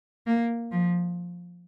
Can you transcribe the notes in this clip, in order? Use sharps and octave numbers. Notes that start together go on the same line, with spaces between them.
A#3
F3